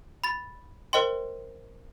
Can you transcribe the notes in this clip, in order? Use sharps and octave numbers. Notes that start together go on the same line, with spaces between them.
B5 A6
A#4 C5 D#5 G5 C6